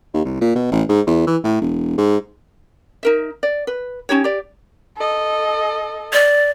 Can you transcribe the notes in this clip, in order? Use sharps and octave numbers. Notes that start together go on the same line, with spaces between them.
D#2
C2
A#2
B2
A1
G#2
E2
E3
A2
E1
G#2
D#4 A#4 E5
D5
B4
C#4 D#4 G4 C#5
G4 D5
A4 D#5
D5